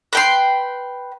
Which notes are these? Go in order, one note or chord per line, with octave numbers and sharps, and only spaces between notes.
B4 G5 C6